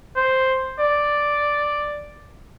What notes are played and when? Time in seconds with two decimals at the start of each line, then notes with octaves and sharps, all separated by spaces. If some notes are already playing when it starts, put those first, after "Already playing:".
0.16 C5
0.79 D5